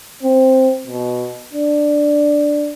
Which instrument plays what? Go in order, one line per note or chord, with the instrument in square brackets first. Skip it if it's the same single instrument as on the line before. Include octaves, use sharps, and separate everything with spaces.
[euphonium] C4
B2
D4